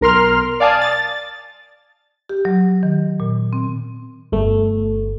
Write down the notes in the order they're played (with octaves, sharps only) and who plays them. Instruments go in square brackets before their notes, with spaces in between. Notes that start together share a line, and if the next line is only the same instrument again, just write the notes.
[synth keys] B1 A#4 C6 F6
D5 F5 G#5 A5 D#6
A6
[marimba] G4
F#3
D#3
A#2
C4
[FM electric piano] G1 A3